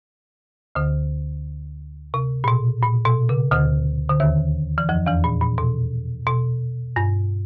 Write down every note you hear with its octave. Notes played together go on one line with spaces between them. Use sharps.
D2 D3
C3
A#2
B2
A#2
B2
C#3
D2 D3
D3
D#2 D#3
E3
F2 F3
E2 E3
A#2
A#2
B2
B2
G2